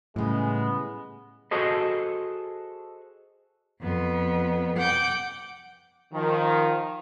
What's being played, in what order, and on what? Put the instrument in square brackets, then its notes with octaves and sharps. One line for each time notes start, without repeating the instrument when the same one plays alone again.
[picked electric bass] A2 [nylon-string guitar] C#3 G3 [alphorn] G#3 [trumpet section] B3 G#4
[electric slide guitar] F#4 G#4 A4 C5 D#5
[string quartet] F2 B3
F#5 G5 D6 G6
[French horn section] D#3 F3